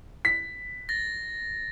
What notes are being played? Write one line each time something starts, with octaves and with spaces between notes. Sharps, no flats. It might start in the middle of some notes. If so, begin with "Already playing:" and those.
B6
A6 A#6